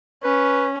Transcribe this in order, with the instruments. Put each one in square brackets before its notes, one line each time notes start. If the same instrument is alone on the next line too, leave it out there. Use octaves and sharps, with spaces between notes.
[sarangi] C#4 [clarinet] B4